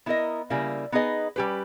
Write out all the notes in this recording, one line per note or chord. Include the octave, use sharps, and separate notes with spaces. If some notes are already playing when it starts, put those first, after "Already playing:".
B3 E4 A#4 D#5
C#3 G3 A#3 E4
B3 D#4 G#4 B4 D#5
G3 C#4 G4 B4